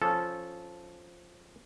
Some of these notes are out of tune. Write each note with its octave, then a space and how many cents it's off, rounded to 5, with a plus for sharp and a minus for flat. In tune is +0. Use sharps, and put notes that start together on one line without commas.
F3 +0 C#4 -5 A4 -15